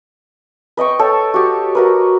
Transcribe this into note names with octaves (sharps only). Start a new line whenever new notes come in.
B4 D#5 G5 C#6
A4 C#5 G5 A5
F#4 G4
F#4 A#4 B4